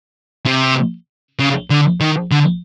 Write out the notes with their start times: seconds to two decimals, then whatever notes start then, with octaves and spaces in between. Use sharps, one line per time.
0.46 C3
1.39 C#3
1.70 D3
2.01 D#3
2.32 D3